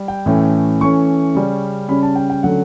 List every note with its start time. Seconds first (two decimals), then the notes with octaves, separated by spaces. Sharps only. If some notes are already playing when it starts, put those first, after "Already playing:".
Already playing: G3
0.08 G5
0.26 A2 E3 A3 C#4
0.81 E3 A3 C#4 C#6
1.35 C#3 G3 C#4
1.88 C#3 G3 C#4 B5
2.03 A5
2.16 G5
2.30 G5
2.43 D3 F#3 A3 C#4 F#5